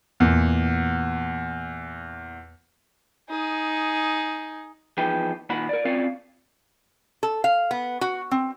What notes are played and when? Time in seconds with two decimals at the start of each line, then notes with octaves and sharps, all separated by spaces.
0.20 E2 A#2
3.30 D#4 G#4
4.97 E2 F3 D#4 G#4 B4 G5
5.50 A#2 D#3 F#5 B5
5.69 A#4 D5
5.85 C4 C#4 F4 C#5 D5 F5
7.23 A4
7.44 F5
7.71 B3
8.01 F#4
8.31 C4